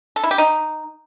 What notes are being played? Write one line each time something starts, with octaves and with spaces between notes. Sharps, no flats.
A4
E4
G4
D#4